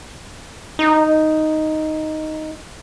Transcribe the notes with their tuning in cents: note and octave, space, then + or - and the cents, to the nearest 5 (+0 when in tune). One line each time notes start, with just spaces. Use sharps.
D#4 +0